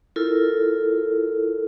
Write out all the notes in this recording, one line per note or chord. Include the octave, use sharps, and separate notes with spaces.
E4 F4 A4 A#4